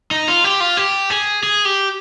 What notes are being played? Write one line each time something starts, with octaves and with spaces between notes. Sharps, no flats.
D#4
F4
G4
F4
G4
G#4
G#4
G4